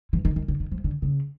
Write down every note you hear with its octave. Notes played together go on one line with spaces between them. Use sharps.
E3
D#3
D#3
D3
D#3
F3
D3
C#3